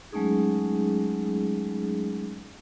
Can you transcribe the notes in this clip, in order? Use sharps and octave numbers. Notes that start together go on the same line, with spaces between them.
F#3 G#3 A3 C#4 D#4 G#4